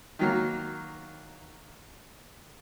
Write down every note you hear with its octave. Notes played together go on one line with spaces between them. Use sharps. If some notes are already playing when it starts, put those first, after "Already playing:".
D#3 F#3 A#3